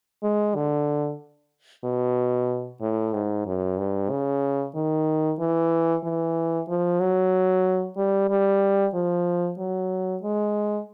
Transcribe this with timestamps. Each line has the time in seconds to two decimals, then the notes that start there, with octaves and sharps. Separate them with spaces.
0.23 G#3
0.55 D3
1.84 B2
2.81 A2
3.13 G#2
3.46 F#2
3.78 G2
4.10 C#3
4.75 D#3
5.39 E3
6.04 E3
6.68 F3
7.00 F#3
7.97 G3
8.29 G3
8.94 F3
9.58 F#3
10.22 G#3